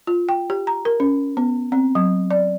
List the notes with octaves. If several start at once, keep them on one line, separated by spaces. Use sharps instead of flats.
F4
G5
G4
A#5
A#4
C#4
B3
C4
F#3
D5